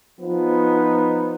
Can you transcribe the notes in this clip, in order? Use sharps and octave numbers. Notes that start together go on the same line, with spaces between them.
F3 B3 D#4